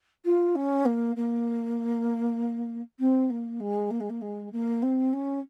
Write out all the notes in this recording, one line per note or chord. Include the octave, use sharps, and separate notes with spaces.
F4
C#4
A#3
A#3
C4
A#3
G#3
A#3
G#3
A#3
G#3
A#3
C4
C#4